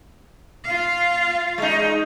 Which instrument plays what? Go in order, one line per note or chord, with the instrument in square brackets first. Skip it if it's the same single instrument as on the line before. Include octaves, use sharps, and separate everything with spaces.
[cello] F4 F5
[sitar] G#3 D#4